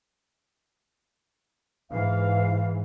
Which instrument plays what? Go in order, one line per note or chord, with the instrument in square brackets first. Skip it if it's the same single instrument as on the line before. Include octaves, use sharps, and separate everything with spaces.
[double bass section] G#2 E3 [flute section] F5